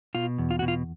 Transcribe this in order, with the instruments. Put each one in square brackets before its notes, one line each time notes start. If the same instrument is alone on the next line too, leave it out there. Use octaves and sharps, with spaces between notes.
[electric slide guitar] B2 F4
E2
F4
B2 F#4
F4